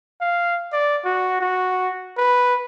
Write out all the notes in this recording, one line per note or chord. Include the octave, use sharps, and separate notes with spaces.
F5
D5
F#4
F#4
B4